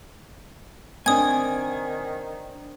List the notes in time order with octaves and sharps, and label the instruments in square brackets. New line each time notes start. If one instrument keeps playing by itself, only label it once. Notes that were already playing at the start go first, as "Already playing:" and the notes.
[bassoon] D#3 [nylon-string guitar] C4 D4 [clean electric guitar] G#5 [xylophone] D#6 G#6